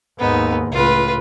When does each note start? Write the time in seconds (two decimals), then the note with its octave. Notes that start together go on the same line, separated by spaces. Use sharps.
0.19 D#2 G#2 B3 D#4
0.72 C#2 A2 F4 B4